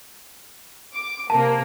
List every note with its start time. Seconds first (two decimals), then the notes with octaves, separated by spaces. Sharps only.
0.93 D6
1.30 C3 A#3 A5